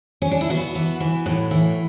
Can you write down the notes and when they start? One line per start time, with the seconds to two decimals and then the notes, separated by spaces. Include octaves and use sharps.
0.22 C#4
0.31 D4
0.41 E4
0.50 B3 F#4
0.75 E3
1.00 E3
1.26 A2
1.51 E3